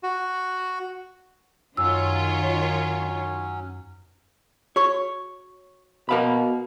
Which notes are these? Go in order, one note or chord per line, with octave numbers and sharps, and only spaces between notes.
F#4
F#2 D#3 F#3 C#4 F4 C#5 E6
F#4 C#5 C#6
B2 A#4 F5 B5